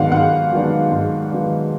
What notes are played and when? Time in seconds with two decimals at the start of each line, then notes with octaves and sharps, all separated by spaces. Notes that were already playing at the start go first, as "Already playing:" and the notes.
Already playing: G#2 D#3 F#3 B3 D4 F5 F#5
0.12 G#2 F#5
0.52 D#3 F#3 B3 D4
0.92 G#2
1.31 D#3 F#3 B3 D4